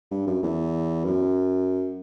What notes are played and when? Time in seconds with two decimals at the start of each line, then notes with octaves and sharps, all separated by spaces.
0.11 G2
0.27 F#2
0.43 E2
1.05 F#2